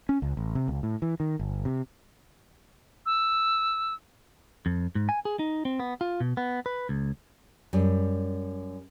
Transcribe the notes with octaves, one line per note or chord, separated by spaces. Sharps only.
C#4
C#2
A1
C3
C#2
A2
E3
D#3
G1
C3
E6
F2
G#2
G#5
G#4
D#4
C4
B3
F4
B2
B3
B4
C#2
F#2 G3